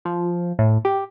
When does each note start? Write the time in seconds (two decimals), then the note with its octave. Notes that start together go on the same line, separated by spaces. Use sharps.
0.05 F3
0.59 A2
0.85 G4